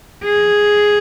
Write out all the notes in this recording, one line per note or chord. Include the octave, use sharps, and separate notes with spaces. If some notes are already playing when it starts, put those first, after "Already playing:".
G#4